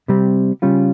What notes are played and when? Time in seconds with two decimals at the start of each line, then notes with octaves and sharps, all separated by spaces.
0.08 C3 G3 C4
0.62 C#3 G3 C#4 F4